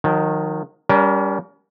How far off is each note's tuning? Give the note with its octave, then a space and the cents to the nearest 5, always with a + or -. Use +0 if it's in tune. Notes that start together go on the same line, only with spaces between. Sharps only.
D#3 -5 F#3 -45
G3 +0 C#4 +40 A#4 +15